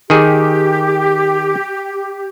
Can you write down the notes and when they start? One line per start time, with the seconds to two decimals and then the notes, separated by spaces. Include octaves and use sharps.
0.10 D#3 G4 G#4